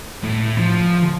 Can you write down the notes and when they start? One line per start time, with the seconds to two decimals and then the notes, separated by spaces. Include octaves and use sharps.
0.23 A2
0.58 F3